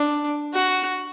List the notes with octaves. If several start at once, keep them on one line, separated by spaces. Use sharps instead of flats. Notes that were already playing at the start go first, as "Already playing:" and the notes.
Already playing: D4
F#4